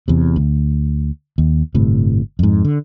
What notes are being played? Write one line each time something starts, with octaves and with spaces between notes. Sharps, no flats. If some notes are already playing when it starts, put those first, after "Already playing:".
E2 C3
D2
D#2
G1 A2 C3
F2 G#2
D3